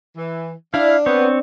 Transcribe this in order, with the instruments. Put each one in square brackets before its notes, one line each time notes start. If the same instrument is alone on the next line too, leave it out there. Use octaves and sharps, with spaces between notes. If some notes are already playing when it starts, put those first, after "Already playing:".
[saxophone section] E3
[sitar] D4 [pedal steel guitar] E4 [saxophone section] F5
[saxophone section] B3 [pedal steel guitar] C4 C#5